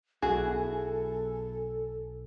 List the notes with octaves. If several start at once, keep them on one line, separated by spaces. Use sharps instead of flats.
B1 E4 F#4 G#4 A4 G#5